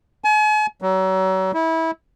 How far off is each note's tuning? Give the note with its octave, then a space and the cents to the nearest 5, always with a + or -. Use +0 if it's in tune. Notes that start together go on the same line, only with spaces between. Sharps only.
G#5 +40
F#3 +35
E4 -25